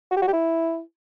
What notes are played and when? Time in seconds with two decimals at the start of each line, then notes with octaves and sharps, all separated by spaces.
0.11 F#4
0.17 G4
0.22 F#4
0.28 G4
0.33 E4